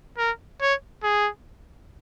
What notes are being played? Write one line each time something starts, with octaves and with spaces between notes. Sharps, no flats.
A#4
C#5
G#4